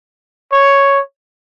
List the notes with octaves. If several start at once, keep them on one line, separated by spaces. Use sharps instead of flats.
C#5